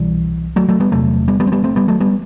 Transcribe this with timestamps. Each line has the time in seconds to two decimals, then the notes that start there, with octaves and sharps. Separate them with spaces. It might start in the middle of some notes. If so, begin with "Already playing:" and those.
Already playing: C2 B2 E3 G3
0.56 F#3 A3
0.68 F#3 A3
0.80 G3 B3
0.92 E2 C3 F#3 A3
1.28 G3 B3
1.40 G3 B3
1.47 C4
1.52 G3 B3
1.64 A3 C4
1.76 G3 B3
1.88 F#3 A3
2.00 G3 B3